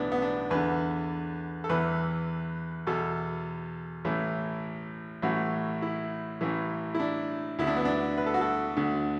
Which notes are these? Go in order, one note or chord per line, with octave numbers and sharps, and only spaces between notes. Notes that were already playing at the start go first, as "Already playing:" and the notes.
Already playing: B1 A2 E3 B3 D4
B3
D4
E2 D3 B4
A4
E2 E3 B4
E2 B2 A4
A1 A2 E3
A1 A2 E3 F#4
E4
A1 A2 E3
E4
D4
D2 D3 E4
D4
B3
D4
B4
A4
F#4
A4
D2 D3